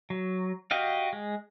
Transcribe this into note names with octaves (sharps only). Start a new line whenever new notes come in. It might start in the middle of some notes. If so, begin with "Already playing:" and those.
F#3
F#4 G4 D#5 F5
G#3